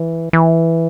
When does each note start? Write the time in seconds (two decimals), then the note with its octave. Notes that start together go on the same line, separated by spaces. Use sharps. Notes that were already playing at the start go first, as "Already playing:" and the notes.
Already playing: E3
0.33 E3